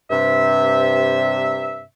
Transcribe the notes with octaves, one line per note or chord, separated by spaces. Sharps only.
G2 C3 E5